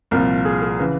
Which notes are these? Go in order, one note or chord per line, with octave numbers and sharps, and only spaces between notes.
C2 A#2 F3 A#4
G#4
G#4
C#3 E3 B4